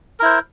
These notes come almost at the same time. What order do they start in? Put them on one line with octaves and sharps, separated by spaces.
A#4 E4 C5